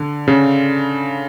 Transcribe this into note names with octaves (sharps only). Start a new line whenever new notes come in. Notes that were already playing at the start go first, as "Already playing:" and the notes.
Already playing: D3
C#3